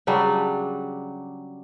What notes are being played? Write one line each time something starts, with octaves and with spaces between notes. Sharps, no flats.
C#3 F#3 G3 D4